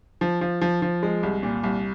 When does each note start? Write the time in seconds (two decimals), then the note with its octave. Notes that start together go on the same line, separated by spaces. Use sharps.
0.21 F3
0.41 F3
0.61 F3
0.82 F3
1.03 G#3
1.23 C2
1.43 A#2
1.63 C2